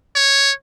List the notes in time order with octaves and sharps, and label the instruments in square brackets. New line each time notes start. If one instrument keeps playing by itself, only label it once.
[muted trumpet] C#5